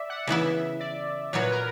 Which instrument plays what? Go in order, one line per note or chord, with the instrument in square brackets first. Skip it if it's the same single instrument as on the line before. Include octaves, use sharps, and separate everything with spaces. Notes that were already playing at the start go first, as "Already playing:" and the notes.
Already playing: [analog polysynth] D5 E5
F#5
[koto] C#3 E3 B3 E4 [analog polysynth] E5
[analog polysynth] D5
[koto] A#2 F#3 B3 F#4 [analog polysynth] C#5
[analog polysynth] B4
A#4